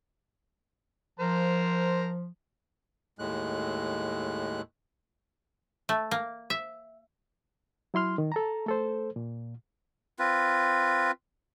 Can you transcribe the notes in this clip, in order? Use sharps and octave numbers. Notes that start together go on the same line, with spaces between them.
F3 A#4 C5 A#5
D#2 A2 G#3 F#6
A3
A#3
E5
F#3 E4 C6 F6
D#3
A4 A5 A#5
A3 A4 C5
A#2
C4 F4 B4